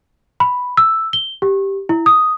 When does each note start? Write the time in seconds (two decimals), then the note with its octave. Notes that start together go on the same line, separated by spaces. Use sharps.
0.40 B5
0.77 E6
1.13 G7
1.42 G4
1.89 E4
2.06 D#6